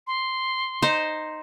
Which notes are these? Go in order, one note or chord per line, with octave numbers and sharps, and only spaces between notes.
C6
D#4 C5